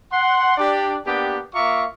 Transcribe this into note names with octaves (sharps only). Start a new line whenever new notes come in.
F#5 C6
D4 G4 D5
A#3 B3 D4 G4
A#3 F4 E5 A#5 C#6 D6